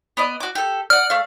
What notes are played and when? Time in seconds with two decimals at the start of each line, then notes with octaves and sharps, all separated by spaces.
0.17 B3 D5 D#5
0.40 F#4 D6
0.55 G4 A4
0.90 D5 F#5 F6
1.10 A3 F5